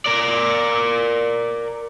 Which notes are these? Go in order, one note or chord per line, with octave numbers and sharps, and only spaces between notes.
A#4 D5